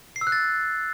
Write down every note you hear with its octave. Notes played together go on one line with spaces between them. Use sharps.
C7
E6
F#6
A6